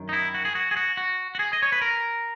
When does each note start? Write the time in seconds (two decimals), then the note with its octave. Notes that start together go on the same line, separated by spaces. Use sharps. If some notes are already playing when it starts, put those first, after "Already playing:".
Already playing: F#2 D#3
0.09 D#4
0.13 E4
0.34 F#4
0.45 G#4
0.55 F#4
0.71 G#4
0.76 F#4
0.97 F#4
1.35 F#4
1.39 G#4
1.53 D#5
1.62 C#5
1.72 B4
1.81 A#4